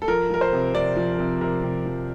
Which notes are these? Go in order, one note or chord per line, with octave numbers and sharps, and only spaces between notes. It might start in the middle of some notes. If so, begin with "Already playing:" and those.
A4
F3 A#4
F3 A#4
C5
C3
C3 D5
F3
C3
C3 A#4
C3
F3